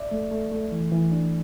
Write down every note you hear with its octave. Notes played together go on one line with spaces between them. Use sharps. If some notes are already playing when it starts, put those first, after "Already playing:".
Already playing: D5 E5
A3
A3
A3
E3
E3
D4